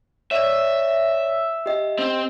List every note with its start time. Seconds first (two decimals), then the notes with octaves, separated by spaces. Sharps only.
0.31 C#5 D5 E5
1.66 G4 D#5
1.98 C4